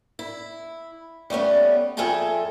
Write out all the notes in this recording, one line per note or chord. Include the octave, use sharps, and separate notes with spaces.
E4
G3 A3 B3 C#4
F2 G#4 A4 E5 G5 A5